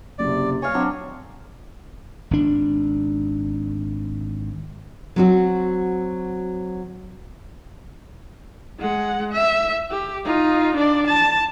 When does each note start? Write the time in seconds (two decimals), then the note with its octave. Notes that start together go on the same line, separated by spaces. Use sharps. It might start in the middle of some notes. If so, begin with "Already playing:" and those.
0.19 F#1 C3 D5
0.62 C#5 D#5 F5 G#5
0.74 F#3 C4 D4
2.31 G#1 D4
5.16 F#3 C4 F#4
8.79 G#3 F#5
9.33 E5
9.91 G4
10.25 D#4 F4
10.76 D4 D5
11.07 A5